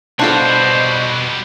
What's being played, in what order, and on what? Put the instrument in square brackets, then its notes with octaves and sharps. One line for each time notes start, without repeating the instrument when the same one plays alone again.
[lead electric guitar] B2 [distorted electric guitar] G3 F#4 [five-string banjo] D4 F4 A4 [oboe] C5